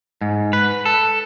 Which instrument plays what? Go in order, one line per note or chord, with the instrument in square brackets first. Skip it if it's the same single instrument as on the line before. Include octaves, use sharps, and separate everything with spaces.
[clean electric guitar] G#2
B4
A4